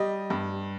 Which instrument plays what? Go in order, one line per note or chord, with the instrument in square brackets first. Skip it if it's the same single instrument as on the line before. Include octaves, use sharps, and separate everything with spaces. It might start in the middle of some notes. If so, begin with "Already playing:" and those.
Already playing: [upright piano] G3 D#5
G2